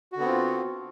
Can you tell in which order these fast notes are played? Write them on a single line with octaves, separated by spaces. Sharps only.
F#4 D3 B3 C4 F4